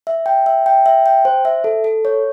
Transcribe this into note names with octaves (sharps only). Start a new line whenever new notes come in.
E5
G5
E5
G5
E5
G5
C5
E5
A4
A4
C#5